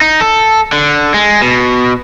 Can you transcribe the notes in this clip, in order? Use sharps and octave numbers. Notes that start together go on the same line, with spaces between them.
D#4
A4
D3
G#3
B2